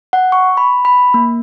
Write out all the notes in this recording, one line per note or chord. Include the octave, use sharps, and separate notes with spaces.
F#5
C#6
B5
B5
A#3